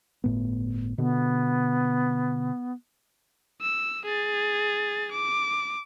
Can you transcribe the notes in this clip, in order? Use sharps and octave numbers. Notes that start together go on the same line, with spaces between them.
G1 A2 B3
B2 D3 B3
E6
G#4 A6
D6